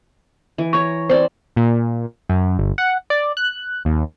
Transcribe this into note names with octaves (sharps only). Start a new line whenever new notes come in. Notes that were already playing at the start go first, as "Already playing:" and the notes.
E3
C#5 A#5 C#6
C4 C5 D5
A#2
F#2
G1
F#5
D5
F#6
D#2